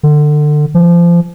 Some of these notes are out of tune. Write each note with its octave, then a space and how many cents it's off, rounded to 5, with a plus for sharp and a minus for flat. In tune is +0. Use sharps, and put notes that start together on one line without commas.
D3 +25
F3 -25